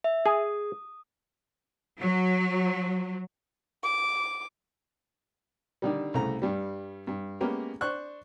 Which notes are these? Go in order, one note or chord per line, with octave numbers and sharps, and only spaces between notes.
E5
G#4 D#6
F#3
D6
D3 D#3 G3
C2 C#3 A3 A#5
G2 G3
G2
G#3 A#3 B3 C#4 G4 A#4
D4 C5 C#6 F#6